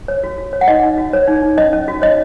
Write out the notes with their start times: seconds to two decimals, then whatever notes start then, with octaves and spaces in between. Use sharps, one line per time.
0.08 C#5
0.23 F#4
0.38 F#4
0.53 C#5
0.61 F#5
0.68 D#4 D#5
0.83 D#4
0.98 F#4
1.13 C#5
1.27 D#4
1.42 D#4
1.57 C#4 D#5
1.73 C#4
1.88 F#4
2.02 C#5 D#5